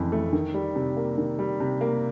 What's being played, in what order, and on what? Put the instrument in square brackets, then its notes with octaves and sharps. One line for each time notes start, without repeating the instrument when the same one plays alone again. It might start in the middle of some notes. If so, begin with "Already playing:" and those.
Already playing: [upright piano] F2 C#3 E3
A3
D#3
G3
C3
A#3
D#3
G3
C3
A#3